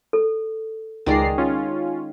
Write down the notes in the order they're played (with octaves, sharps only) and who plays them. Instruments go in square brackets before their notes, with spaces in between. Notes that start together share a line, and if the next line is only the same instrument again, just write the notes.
[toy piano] A4
[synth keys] C#2 D5 C7 [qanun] D#3 G#3 A#5
[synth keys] C#4 F4